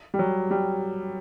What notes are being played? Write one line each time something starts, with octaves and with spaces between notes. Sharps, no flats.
G3
F#3
G3